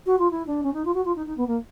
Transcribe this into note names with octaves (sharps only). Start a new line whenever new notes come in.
F#4
F4
E4
D4
C#4
D#4
F4
F#4
F4
D#4
D#4
B3
A#3